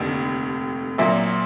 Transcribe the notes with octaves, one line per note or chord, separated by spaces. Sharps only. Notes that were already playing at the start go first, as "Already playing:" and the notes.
Already playing: F1 D#2 D3
A#1 A#2 F#3 A#3 E5